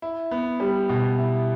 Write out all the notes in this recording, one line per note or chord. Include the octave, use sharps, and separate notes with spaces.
E4
B3
G3
B2
E4